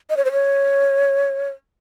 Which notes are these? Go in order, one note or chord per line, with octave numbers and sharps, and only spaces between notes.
D#5
C#5
C5
C#5